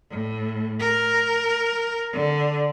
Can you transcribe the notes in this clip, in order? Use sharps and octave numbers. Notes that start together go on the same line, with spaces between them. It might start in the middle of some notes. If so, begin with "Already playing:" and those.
A2
A#4
D3